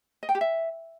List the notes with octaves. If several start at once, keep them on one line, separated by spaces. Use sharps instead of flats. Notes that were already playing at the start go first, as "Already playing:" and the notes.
D#5
G5
G4
E5